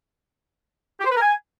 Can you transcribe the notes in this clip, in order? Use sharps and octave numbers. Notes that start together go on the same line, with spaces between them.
G4
C5
B4
A#4
G#5